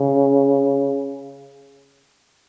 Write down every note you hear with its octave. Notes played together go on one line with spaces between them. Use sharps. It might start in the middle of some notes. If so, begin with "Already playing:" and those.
Already playing: C#3